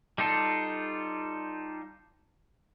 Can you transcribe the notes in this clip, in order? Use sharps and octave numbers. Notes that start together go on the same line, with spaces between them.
G3 D#4 F4 A4